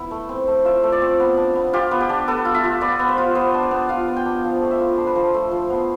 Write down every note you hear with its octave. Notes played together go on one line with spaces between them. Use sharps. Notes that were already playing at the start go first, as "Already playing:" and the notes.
Already playing: B3 E4
A3
C4
A3
F4 E5
A3
D5
C4
B3
D4
B3
F4 G4
B3
G4
D4
B3 A4
F4
E5
F4
B3 D5
B3
C5
F4
B3 C5
D4
D5
B3
F4 F5
B3
G5
D4
F3
A3
E5
F4
D4 C5
B4
F3 C5
A3
F3
B3